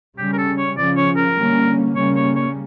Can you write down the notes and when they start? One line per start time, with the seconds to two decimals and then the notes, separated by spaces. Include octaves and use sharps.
0.18 C#3 G3 C#4 G4
0.33 A#4
0.38 A4
0.58 C#5
0.77 C#3 F3 C#4 D5
0.97 C#5
1.17 A#4
1.37 D3 G3 A#3 C#4
1.96 C#3 G3 A#3 C#4 C#5
2.16 C#5
2.36 C#5